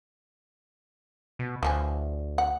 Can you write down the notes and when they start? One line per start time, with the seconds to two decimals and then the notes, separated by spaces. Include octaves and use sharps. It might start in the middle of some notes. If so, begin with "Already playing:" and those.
1.39 B2
1.63 D2 E3 F3 G#5
2.38 F#5